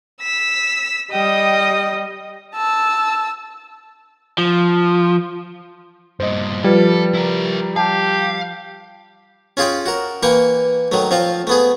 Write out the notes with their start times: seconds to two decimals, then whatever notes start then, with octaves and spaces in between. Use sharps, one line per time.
0.21 E6 B6
1.12 G3 D#5 G5 D#6
2.55 A5 E6
4.38 F3
6.20 G2 A#2 C5 D#5
6.64 F3 G3 F4 A4 B4
7.14 E4 A#4
7.76 G4 F5 A5
9.57 C#4 F4 G#4 G5
9.86 F#4 A#4
10.23 E3 A#3 G5 C#6
10.92 D#3 F#3 A3
11.11 F3 C4 F4
11.47 A3 B3 G#4